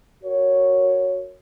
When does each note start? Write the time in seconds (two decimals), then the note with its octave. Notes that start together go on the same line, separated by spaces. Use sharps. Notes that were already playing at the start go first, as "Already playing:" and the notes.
0.24 F#4 A#4 C#5